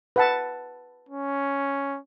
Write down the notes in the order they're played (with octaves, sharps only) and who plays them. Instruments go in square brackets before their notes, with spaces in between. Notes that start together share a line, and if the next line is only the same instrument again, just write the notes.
[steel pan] B4 F#5 A5
[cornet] C#4